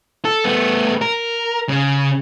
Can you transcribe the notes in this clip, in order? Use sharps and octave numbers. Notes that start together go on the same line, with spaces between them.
A4
A3 B3
A#4
C#3